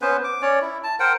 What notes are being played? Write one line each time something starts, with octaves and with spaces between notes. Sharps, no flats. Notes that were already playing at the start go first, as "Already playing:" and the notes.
B3 C#4 B4 C5
D6
C#4 C#5 D5
E4
A5
A#4 C5 F#5 G5